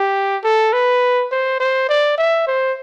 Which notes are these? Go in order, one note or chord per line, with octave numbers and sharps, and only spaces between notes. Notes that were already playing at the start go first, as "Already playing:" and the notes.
Already playing: G4
A4
B4
C5
C5
D5
E5
C5